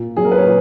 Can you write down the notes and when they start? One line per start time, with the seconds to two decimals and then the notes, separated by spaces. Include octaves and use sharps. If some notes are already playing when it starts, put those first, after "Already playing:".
Already playing: A#2
0.17 F#3 G#4
0.25 A#4
0.31 B4
0.38 C#5
0.46 A#2